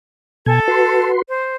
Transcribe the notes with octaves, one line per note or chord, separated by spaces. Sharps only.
B2 A4 G#5
F#4 B4 C6
C5